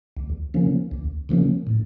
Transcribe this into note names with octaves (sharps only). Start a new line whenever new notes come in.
D2
C#3 F3 A#3 C#4
D2
C#3 F3 A#3 C#4
A2